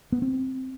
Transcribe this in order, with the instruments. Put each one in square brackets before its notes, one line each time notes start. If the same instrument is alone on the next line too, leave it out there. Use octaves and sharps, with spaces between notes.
[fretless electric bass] B3
C4